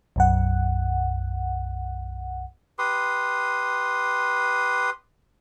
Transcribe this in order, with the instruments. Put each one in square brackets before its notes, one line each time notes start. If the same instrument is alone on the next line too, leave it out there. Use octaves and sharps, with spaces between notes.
[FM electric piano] B1 F#2 F#5
[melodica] G4 B4 C6 D#6